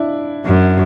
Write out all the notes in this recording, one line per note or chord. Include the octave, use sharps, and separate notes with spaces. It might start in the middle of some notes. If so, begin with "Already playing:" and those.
Already playing: D4 E4
F#2